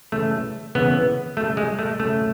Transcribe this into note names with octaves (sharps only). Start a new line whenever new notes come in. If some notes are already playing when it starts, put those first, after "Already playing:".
C#3 E3 A3
C#3 E3 B3
C#3 F#3 A3
G#3
A3
C#3 F#3 A3